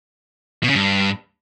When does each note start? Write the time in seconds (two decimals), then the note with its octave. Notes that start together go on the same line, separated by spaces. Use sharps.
0.64 B2
0.69 C#3
0.75 G2